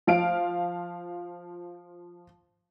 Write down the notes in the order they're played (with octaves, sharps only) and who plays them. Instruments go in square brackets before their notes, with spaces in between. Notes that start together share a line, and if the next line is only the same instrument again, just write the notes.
[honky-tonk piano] F3 F5 D7